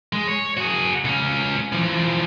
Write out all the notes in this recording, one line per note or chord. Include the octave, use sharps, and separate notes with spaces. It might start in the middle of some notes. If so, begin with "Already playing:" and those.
G#3
C#5
F#4 G#4
C#2 C#4
E3 F3